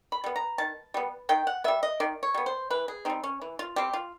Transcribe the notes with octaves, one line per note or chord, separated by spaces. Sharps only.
B5
G3 B3
A#5
D#3 A5
G3 B3
D#3 G5
F#5
G3 B3 E5
D#5
D#3 D5
C#5
G3 B3
C5
E3 B4
G#4
G3 C4 D#4
C#4
E3
F4
G3 C4 G4
F4